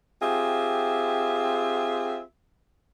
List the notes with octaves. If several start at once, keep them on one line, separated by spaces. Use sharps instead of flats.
C4 F4 G4 G#4 E5